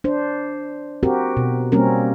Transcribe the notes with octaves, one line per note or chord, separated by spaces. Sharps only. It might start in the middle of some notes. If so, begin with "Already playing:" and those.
D4 C5
C4 F#4 G4 A#4
B2
G3 A#3 C4 C#4 A#4